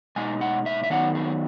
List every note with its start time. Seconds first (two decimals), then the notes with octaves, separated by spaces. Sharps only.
0.16 B2 G#3 D#4 G#5
0.41 F#5
0.66 E5
0.84 E5
0.90 D#3 F#3 B3 D#4 F#5
1.15 G#4